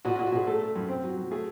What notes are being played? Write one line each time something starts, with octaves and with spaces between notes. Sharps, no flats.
A#2 F#4
F#4
A#2
F#4
A#2 G#4
A3 A4
A3
F#2
C4
F#3
F#3
A3 G#4